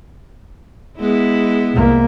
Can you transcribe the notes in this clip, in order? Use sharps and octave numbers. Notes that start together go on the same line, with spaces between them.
G#3 B3 E4
C2 A#3